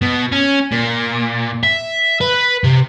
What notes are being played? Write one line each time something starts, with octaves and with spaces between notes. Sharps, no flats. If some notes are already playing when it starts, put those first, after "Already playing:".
B2
C#4
A#2
E5
B4
C3